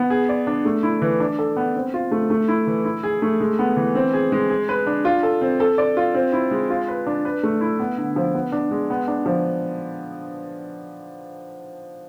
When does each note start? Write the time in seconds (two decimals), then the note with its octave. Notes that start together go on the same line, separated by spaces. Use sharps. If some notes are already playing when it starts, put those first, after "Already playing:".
Already playing: B3
0.10 G#4
0.29 D5
0.47 D4
0.65 A3
0.83 E4
1.02 E3
1.20 D4
1.39 A4
1.57 B3
1.75 C4
1.94 F4
2.11 A3
2.30 A3
2.48 E4
2.67 E3
2.84 E4
3.03 G#4
3.22 A3
3.40 G#3
3.59 B3
3.77 E3
3.95 C4
4.13 G#4
4.32 G#3
4.50 G#4
4.69 B4
4.87 D4
5.05 F4
5.23 A4
5.41 C4
5.60 A4
5.78 D5
5.97 F4
6.14 C4
6.33 E4
6.51 G#3
6.70 F4
6.88 B4
7.07 D4
7.25 B4
7.43 A3
7.61 E4
7.80 B3
7.98 D3
8.16 F3
8.35 B3
8.52 D4
8.71 G#3
8.90 B3
9.08 D4
9.26 F3